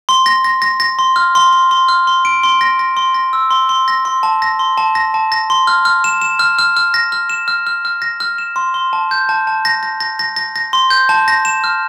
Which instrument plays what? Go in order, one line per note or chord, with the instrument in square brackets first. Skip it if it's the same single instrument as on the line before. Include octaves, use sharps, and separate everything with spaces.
[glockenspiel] C6
A#6
A#6
A#6
A#6
C6
F6
C6
C6
C6
F6
C6
D7
C6
A#6
A#6
C6
A#6
E6
C6
C6
A#6
C6
A5
A#6
C6
A5
A#6
A5
A#6
C6
F6
F6
E7
E7
F6
F6
F6
A#6
F6
E7
F6
F6
F6
A#6
F6
E7
C6
C6
A5
G6
A5
A5
A#6
A#6
A#6
A#6
A#6
A#6
C6
G6
A5
A#6
E7
F6